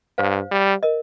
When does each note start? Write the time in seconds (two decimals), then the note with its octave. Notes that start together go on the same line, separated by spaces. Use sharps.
0.18 G2 C5 F5
0.51 G3
0.83 A#4 D#5